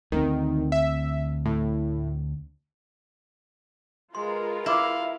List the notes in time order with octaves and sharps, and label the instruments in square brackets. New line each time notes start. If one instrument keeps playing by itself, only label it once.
[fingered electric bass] D2 G#3 C4 [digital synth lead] D#3
[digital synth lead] E5
A2
[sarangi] G#3 [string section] F4 A#4 B4 [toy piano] C6
[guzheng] E4 [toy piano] D5 C6 D6 [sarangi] F5